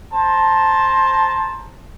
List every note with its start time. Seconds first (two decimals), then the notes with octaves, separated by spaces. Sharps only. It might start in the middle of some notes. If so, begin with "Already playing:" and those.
0.13 C5 A5 A#5